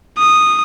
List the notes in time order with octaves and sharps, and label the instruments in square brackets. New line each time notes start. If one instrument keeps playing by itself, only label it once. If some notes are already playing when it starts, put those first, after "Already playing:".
[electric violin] D#6